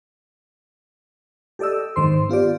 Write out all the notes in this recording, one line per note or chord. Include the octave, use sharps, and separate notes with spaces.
G4 A4 D5 D#5 E6
G#2 D#3 C5 C6
B3 F4 G4 D5